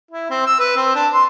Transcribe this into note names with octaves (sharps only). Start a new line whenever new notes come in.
E4
C4
E6
B4
C4
D4
C6